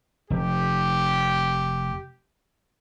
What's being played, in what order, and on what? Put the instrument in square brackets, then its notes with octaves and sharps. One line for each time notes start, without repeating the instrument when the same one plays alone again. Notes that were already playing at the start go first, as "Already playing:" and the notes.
[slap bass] F1 [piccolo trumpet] G4